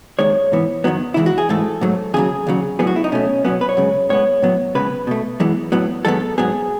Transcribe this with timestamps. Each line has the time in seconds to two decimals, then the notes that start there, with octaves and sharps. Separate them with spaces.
0.19 D#2 D#3 G#3 C#5
0.52 G#2 E3 B3
0.84 F#2 D#3 F#3 B3
1.14 C#2 C#3 E3 G#3 E4
1.26 F#4
1.38 G#4
1.49 G#2 E3 A3 A4
1.81 G#2 F#3 A3
2.14 D#2 C#3 F#3 G#4
2.47 D#2 C#3 F#3
2.79 A2 F#3 B3 G#4
2.87 F#4
2.96 E4
3.04 D#4
3.12 B2 A3 C#4
3.45 B2 F#3 B3 C#4
3.61 B4
3.69 C#5
3.77 F#2 C#3 G#3
4.09 A2 G#3 B3 C#5
4.42 A2 F#3 B3
4.75 C#2 C#3 G#3 B3 B4
5.07 B2 A3
5.40 F#2 E3 G#3 B3
5.72 A2 F#3 B3
6.05 F#2 D#3 G#3 B3 A4
6.38 G#2 F#3 B3 G#4